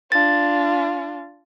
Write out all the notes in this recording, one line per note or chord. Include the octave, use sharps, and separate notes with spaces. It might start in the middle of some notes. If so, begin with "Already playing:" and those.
D4 F4 A6